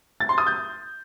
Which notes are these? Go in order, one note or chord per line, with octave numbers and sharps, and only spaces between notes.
A6
C6
D#6
G6